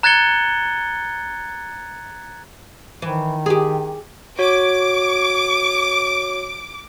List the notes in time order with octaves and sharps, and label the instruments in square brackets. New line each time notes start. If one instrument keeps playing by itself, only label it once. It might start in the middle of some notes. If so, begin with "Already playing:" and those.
[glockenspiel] A#5 F#6 G#6 A6 C#7 G7
[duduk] D#3 [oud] E3
[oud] G4 G#4
[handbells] F#4 C#5 [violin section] D6